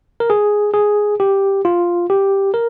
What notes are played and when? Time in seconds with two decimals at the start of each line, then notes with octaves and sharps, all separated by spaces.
0.20 A#4
0.30 G#4
0.74 G#4
1.20 G4
1.65 F4
2.10 G4
2.54 A#4